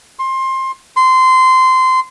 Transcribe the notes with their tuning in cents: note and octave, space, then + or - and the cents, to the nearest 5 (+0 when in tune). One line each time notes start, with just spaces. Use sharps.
C6 +20
C6 -20